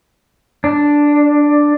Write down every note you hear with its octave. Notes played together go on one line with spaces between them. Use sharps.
D4